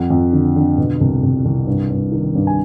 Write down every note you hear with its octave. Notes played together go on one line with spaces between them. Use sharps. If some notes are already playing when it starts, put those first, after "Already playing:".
Already playing: F2 F#5
F2
D3
D3
B2
C2
C2
C2
G2
G2
D#3
G2
G#5